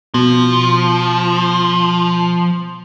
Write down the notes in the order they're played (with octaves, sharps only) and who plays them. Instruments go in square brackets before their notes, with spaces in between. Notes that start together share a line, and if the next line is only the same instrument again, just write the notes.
[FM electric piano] B2 [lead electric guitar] F3